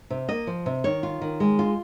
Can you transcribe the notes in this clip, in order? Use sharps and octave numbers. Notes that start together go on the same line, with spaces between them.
C3
A#3 D#5
F3
C3
D#3 C#5
F4
D#3
G#3
F4